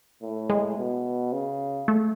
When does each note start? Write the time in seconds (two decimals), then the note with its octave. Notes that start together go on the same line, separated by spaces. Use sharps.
0.22 A2
0.50 G#3
0.78 B2
1.33 C#3
1.88 A3